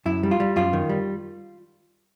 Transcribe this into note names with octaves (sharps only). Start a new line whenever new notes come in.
F#2 E4
G3
F4
G3
F#2 F4
D#3
G3